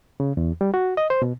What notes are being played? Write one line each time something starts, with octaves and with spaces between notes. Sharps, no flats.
C#3
E2
G3
F#4
D#5
C5
B2